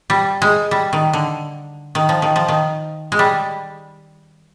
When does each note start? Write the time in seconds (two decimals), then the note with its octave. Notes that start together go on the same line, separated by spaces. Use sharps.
0.10 G3
0.42 G#3
0.71 G3
0.93 D#3
1.13 D3
1.95 D#3
2.09 F3
2.22 D#3
2.36 F3
2.48 D#3
3.12 G#3
3.19 G3